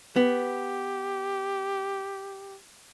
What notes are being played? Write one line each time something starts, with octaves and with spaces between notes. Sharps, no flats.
B3 G4